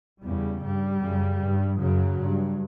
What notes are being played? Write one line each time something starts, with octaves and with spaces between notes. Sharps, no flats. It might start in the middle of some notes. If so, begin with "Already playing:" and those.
E2 C#3 G3
G2 G3
F#2 C#3
G2
F#2 C#3 F#3
G2